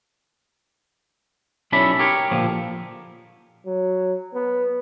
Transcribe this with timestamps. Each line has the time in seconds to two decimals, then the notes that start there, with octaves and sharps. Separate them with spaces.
1.72 B1 C#4 E4 A4 D5 B5
1.99 G4 A#4 C#5
2.31 A#2 D3 F3
3.66 F#3
4.34 B3